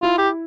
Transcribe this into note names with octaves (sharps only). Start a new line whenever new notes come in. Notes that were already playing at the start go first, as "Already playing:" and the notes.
E4 F4
G4